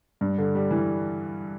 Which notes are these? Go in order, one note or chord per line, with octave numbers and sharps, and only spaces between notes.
G2
D3
G3
E3